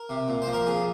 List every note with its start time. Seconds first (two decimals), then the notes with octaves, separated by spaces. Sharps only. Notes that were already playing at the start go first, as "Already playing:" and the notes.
Already playing: A#4
0.09 C3
0.28 A#2
0.42 C5
0.47 F3
0.53 A#4
0.66 A#2 G#4